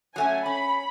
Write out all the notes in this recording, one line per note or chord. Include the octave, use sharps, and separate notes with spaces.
F#3 A3 C#4 G#5
C#4 B5